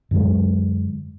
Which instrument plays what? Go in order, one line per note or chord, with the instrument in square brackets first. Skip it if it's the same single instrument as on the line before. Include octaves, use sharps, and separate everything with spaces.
[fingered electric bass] F#2 D3 F#3 G#3